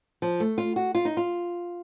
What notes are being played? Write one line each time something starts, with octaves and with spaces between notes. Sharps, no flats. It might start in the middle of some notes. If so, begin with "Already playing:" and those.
F3
A3
F4
F#4
F4
D#4
F4